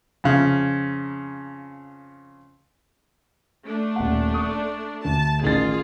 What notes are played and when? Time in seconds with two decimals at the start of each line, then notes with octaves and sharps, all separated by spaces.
0.24 F2 C#3 F5
3.67 A3 D4
3.96 D#1 F#5
4.34 C#6 D#6
5.05 D2 A5
5.43 A1 D#3 F4 G#4 A6